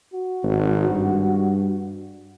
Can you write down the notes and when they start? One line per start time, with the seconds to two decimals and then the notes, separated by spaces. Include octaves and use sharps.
0.13 F#4
0.43 G#1
0.89 G2